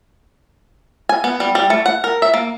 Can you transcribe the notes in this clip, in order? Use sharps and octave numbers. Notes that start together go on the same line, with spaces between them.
G#5
B3
G3
G3
A3
F#5
A#4
E5
A#3